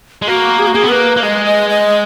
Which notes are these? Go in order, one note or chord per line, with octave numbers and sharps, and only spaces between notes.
G#3
A#3 F#4
G#4
F#4
A#3 G#4
B3
A#3 B4
A#3
G#3 D#5
D#5
D#5